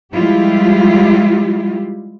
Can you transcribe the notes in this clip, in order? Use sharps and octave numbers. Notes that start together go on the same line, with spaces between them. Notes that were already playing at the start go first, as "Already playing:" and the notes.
F3 G3 G#3 E4 F4 G4